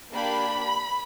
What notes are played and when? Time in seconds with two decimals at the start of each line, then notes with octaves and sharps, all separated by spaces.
0.13 A#3 D4 G4 B5